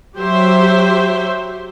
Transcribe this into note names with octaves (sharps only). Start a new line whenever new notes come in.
F#3 G4 C5 E5